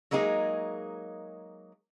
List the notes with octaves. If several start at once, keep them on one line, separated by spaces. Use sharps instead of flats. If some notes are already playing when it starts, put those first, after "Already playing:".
F#3 G#3 A#3 D#4 G#4